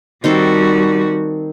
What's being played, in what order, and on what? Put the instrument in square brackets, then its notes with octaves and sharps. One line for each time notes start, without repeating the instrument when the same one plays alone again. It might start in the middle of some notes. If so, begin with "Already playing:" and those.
[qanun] D#3 C4 A4 [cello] G3 F#4